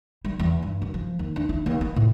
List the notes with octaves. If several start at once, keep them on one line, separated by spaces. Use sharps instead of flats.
G3
E2
G2
F#2
F3
D#2
D4
E4
D#2
B3
A2